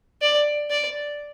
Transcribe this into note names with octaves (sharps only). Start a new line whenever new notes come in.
D5
D5